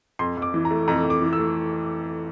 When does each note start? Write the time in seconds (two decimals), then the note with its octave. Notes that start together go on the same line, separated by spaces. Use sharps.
0.19 F2 C6
0.37 F2
0.42 D6
0.54 E3
0.65 A#5
0.71 A3
0.88 F2 A#5
1.05 F2
1.10 D6
1.22 E3
1.33 E6
1.38 A3